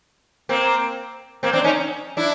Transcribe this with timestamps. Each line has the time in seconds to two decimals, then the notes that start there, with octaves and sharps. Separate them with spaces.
0.49 A#3 C4
1.43 A#3 C4
1.53 C4 D4
1.64 C#4 D#4
2.17 D4 E4